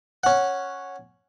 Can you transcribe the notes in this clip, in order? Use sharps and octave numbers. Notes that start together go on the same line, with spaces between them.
C#4 F#5